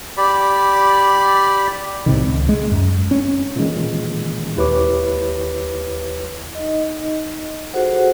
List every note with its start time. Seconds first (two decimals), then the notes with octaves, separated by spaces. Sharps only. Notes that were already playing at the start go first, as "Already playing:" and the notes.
0.17 G4 D5 B5
2.06 C2 A2 C3 D#3
2.24 C#2
2.49 G#3
2.72 F#2
3.11 C#4
3.56 A#2 D#3 E3 G#3 C#4
4.56 D#2 E4 G4 B4 C#5 D6
6.55 D#4 D#5
7.74 F4 F#4 G#4 A4 C5 F#5